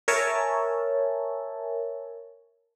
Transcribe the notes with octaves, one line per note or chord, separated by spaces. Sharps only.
A#4 C#5 E5 G#5 A5